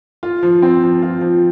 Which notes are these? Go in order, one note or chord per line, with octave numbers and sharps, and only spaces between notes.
F4
F3
C4
F3
F4
F3